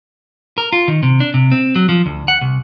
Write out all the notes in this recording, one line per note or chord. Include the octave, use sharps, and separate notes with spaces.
A#4
F4
D#3
C3
D4
C3
C4
F#3
F3
D2
F#5
C2